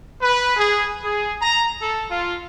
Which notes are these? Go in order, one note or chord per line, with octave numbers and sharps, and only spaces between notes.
B4
G#4
G#4
A#5
A4
F4